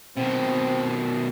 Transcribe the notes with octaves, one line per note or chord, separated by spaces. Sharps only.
B2 D#3 C4